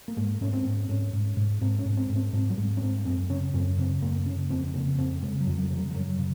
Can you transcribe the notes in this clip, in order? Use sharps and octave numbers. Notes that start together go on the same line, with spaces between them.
A#3
G#2 G#3
G#2 C#4
C4
G#2
G#2 C#4
G#2
G#2
G#2 C4
C#4
G#2
C4
G#2
C4
G#2 C4
F#3
G#2 G#3
C#4
G#2 C4
F#2 C4
C#3 C#4
F#2 C4
C#3 C4
F#2 A#3
C#3 C#4
F2 C4
C#3 A#3
F2 C4
C#3 G#3
F#3
F2
F#3
C#3 F3
F#3
F3
F#2 F#3
C#3